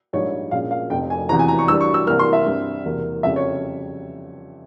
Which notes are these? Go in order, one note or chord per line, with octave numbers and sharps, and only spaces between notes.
A#1 G#2 G3 C#5
A#1 A#2 G#3 C#4 F5
F5
F1 F2 C3 G5
G#5
E2 C3 E3 A#5
G#5
A#5
C#6
G2 E3 G3 E6
C#6
E6
C2 C3 E3 A#3 F6
C6
E5
G2 G3 C4
E1 E2 C3 E3 A#3
F2 C#3 G3 E5
C#5